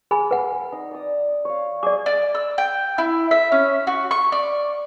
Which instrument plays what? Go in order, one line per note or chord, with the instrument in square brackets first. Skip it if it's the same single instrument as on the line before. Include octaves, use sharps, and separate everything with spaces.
[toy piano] G#4 G#5 B5
B4 F#5
[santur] D#4
D5 D#6
C#5 F5
[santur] G#4 [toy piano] D5 D6
[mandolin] D5
E6
G5
E4
E5
C#4
F#4
C#6
D5